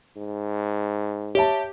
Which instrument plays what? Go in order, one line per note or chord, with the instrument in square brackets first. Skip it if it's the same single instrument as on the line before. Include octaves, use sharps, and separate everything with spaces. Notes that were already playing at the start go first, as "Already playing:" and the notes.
[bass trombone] G#2
[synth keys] G4 [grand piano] C#5 E5 A5